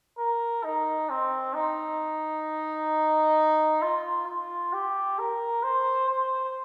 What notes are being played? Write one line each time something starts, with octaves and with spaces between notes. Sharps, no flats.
A#4
D#4
C4
D#4
F4
F4
G4
A#4
C5
C5